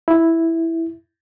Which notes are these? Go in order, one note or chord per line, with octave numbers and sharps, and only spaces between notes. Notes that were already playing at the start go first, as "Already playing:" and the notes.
E4